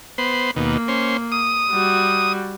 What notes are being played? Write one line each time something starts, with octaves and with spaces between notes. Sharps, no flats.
B3 C5
D#2 B2 A#3
C#4 C5
D#6
G3 F#4